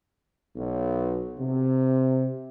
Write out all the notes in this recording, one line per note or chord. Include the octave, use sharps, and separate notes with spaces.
B1
C3